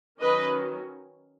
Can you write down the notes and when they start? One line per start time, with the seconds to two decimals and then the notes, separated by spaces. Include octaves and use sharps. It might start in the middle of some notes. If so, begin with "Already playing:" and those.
0.21 D#3 F#3 C#4 B4 D#5